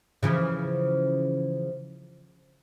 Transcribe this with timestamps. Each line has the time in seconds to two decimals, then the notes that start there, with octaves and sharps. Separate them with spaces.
0.23 C#3 E3 F3